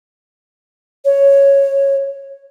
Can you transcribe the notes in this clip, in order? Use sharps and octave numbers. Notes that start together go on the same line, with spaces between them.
C#5